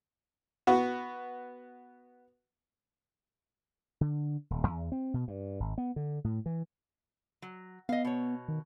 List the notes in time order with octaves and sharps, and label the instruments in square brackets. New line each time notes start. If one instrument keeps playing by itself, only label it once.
[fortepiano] B3 F#4
[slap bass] D3
D#1
E2
C4
B2
G2
G#1
B3
D3
A2
E3
[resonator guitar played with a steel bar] F#3
[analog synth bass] B3 [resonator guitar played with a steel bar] D#5 F5
[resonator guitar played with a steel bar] B2 C#5
[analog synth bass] D#3